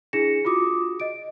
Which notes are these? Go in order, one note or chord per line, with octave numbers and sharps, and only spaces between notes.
D4 E4 G#4 A#6 C#7 E7
F4 F#4 D6 D#6
D#5 D7